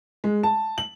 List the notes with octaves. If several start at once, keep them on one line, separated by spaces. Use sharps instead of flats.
G#3
A5
F#7